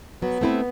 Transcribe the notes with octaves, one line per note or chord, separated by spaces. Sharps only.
F#3 B3
A3 C4 E4 B4